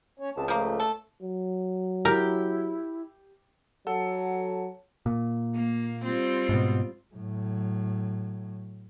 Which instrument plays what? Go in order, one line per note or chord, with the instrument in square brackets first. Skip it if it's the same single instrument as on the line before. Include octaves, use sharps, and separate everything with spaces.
[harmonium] C#4 C#5
[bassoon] C#2 [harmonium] C4 A5
[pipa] F3 A#3 [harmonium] A3
[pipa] A4
[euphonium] F#3
[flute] E4 [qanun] G4 [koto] A#4
[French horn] F#3 [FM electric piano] A4 [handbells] F#5 A5
[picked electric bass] A#2
[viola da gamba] A#3
G3 C4 F4
[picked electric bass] G#2 B2
[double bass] A2 F#3